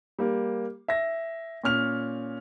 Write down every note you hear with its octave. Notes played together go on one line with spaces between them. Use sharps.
G3 A#3
E5 A#6
A#2 C#4 F6 F7